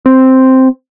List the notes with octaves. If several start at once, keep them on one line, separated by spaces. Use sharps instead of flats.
C4